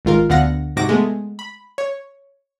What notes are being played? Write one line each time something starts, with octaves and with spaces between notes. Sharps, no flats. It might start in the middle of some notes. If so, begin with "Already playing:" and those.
G#1 G#2 F4 A#4
D2 D3 B3 F5 F#5 A#6
G#2 C3 F#4 D6 A#6
G#3 A3 B3
B5
C#5